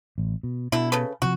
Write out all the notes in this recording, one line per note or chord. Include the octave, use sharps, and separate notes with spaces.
A1
B2
B2 D3 E4
C#3 A4 B4
C3 D#3 F3 F#4